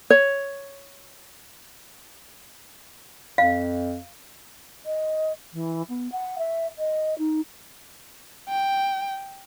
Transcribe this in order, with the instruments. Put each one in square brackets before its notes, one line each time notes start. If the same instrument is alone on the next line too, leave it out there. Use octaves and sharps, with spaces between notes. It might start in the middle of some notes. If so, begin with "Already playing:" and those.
[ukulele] C#5
[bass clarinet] F2 [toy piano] F5
[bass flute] D#5
E3
B3
F#5
E5
D#5
D#4
[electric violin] G5